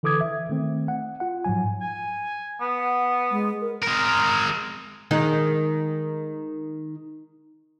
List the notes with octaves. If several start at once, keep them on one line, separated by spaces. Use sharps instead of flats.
D3 E3 A4 D6 D#6 G#6
E5
D#3 A3 C4
F#5
F4 F#5
G#2 F3 F#3 G#5
G#5
B3
F#5
G#3
A#4
G#3 A#4
D#3 G#3 D#4